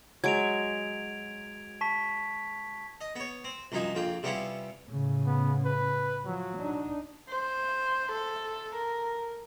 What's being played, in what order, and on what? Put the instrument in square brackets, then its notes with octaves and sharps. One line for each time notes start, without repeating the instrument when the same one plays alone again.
[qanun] F#3 G#3 [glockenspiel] G#6 D7 F7
[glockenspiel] A5 C#6 B6
[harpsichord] D#5
B3 C#5
C4
C2 F#2 F3 D#4 G#5
A#1 F2 F4 G5
C3 G3 B3 C#4 E4 F4
[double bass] A2 C#3
[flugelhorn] B3
B4
[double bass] F3 [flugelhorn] F#3
[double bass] D4 D#4
[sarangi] C5
A4
A#4